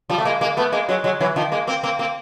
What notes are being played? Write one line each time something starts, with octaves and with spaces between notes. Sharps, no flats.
F3 G3
A3
G#3 A#3
G#3 A#3
A3 B3
G#3 A#3
F#3 G#3
F#3 G#3
E3 F#3
D#3 F3
G#3 A#3
A#3 C4
A#3 C4
A#3 C4